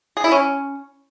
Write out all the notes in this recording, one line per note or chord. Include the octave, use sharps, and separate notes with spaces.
G#4
E4
C#4